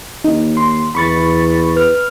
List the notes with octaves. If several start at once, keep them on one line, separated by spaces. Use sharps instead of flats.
D#2 D#4
C6
E2 B5 C#6 A6
B4 F6